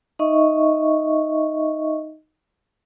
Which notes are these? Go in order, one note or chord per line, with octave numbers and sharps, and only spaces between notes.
D#4 D#5 E5 C#6